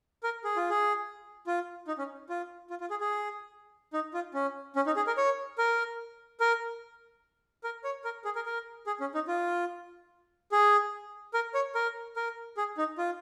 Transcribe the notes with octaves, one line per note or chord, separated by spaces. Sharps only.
A#4
G#4
F4
G#4
F4
D#4
C#4
F4
F4
F4
G#4
G#4
D#4
F4
C#4
C#4
D#4
G#4
A#4
C#5
A#4
A#4
A#4
C#5
A#4
G#4
A#4
A#4
G#4
C#4
D#4
F4
G#4
A#4
C#5
A#4
A#4
G#4
D#4
F4